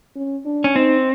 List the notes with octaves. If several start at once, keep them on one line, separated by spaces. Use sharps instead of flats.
C#4
D4
C#4
C4 D#4